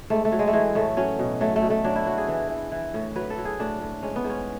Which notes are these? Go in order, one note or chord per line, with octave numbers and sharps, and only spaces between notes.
G#2 A3
A3
F#3
G#3
A3
E3 G#3
A2 A3
F#3 C#4
B2
F#3 A3
A3
B2
A3
F#3 D4
E4
F#3 F#4
G#4
E3
E3
E3
A2
F#3 B4
A4
F#3
G#4
A2 D4
A2
G#2 C#4
B3
G#2
C#4